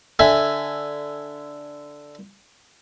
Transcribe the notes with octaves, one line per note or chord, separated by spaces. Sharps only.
D3 E5 G#5